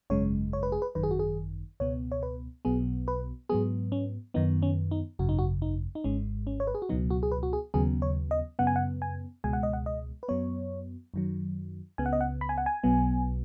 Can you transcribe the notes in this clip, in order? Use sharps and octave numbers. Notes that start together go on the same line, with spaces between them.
G#1 F#2 C#3 G#3 C#5
C#5
B4
G#4
B4
G#1 F#2 D#3 B4
G#4
F#4
G#4
C#2 B2 B3 C#5
C#5
B4
B1 B2 F#3 B3 G#4
B4
G#2 F#3 B3 G#4
C#4
F#2 D#3 B3 D#4
C#4
D#4
G#1 F#2 C#3 F#4
D#4
F#4
D#4
D#4
G#1 G#2 G#3 C#4
C#4
C#5
B4
G#4
F#4
C#2 B2 F#3 B3 D#4
F#4
G#4
B4
F#4
G#4
D#2 C#3 F#3 B3 G#4
C#5
D#5
F#2 C#3 B3 F#5
G#5
F#5
G#5
C#2 B2 G#3 G#5
F#5
D#5
F#5
D#5
B4
F#2 F#3 B3 C#5
F#2 D#3 F#3
C#2 C#3 B3 G#5
F#5
D#5
F#5
B5
G#5
F#5
G#5
B1 B2 F#3 B3